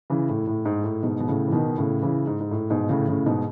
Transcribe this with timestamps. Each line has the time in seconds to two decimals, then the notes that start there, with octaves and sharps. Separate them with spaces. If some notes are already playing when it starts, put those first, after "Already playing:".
0.10 C#3 E3
0.29 A2
0.47 A2
0.65 G#2
0.84 A2
1.03 G#2 B2
1.20 B2
1.28 A2 C#3
1.48 E3
1.52 B2 D#3
1.78 A2 C#3
2.02 C#3 E3
2.27 G#2
2.41 G#2
2.51 A2
2.70 G#2 B2
2.89 A2 C#3
3.08 A2 C#3
3.26 G#2 B2